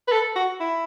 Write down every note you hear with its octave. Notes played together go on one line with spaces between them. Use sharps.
B4
A4
F#4
E4